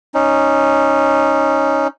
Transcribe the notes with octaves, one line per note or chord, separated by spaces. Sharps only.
C#4 D#4